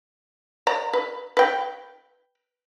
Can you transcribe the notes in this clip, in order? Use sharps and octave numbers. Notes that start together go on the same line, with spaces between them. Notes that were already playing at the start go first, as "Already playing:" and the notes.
D5 A#5
B4
B4 G5